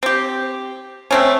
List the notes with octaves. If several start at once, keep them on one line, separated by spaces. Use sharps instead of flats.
C4 G4
A3 C4 C#4